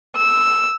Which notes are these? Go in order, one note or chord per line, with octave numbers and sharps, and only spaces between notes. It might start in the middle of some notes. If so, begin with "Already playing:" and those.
E6